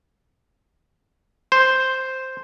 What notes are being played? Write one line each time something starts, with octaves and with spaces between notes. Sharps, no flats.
C5